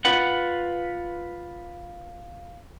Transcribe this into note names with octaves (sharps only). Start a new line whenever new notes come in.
F4 B4 F#5